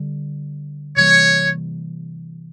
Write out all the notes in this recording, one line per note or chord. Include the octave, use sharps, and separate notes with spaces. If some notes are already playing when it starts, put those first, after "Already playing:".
Already playing: D3 G3
C3 E3 G3 A#3 C#5